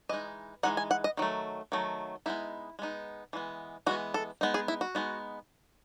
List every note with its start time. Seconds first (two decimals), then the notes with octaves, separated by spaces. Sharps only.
0.09 E3 G#3 D#4 D#5
0.63 E3 G#3 D#4 F#5
0.77 G#5
0.91 F#5
1.04 D#5
1.17 D#3 F#3 A3
1.72 D#3 F#3 A3
2.26 G#3 B3 D#4 E4
2.79 G#3 B3 D#4
3.33 E3 G#3 B3
3.86 E3 G#3 B3 F#4
4.14 A4
4.41 G#3 B3 D#4
4.54 G#4
4.68 E4
4.81 F#4
4.95 G#3 B3 D#4